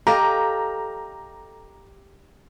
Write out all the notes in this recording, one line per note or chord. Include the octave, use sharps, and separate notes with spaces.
G4 A4 D#5 F5 A#5